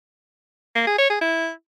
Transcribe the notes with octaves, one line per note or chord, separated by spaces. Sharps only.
A#3
G#4
C#5
G#4
E4